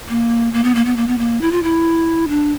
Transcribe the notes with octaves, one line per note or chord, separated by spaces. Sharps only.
A#3
A#3
B3
A#3
B3
A#3
B3
A#3
E4
F4
E4
D4